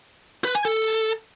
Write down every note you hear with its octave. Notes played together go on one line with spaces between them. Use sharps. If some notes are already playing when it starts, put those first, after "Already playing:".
B4
G#5
A4